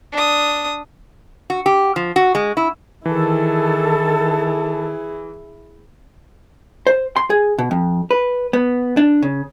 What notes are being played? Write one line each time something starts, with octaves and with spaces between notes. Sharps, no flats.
D4 D#6
F#4
G4
F3
F#4
G#3
E4
D#3 E3 E4 G#4 A4 A5
C5
C6
G#4
B2
F2
B4
B3
D4
C#3